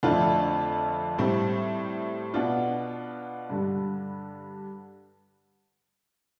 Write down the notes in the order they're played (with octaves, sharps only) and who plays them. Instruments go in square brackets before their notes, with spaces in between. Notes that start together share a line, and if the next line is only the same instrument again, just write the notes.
[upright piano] F2 D3 A3 D4 F4
A2 G3 C4
B2 B3 D4 F4
G2 D3 G3